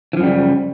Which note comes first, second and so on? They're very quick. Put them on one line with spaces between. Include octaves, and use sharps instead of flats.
E3 F3 F#2 G3 C#3